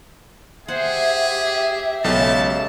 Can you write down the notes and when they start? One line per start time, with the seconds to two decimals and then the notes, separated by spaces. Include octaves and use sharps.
0.68 G4 G#4 C5 E5 F#5
2.04 B1 C#3 G#3 A4 A5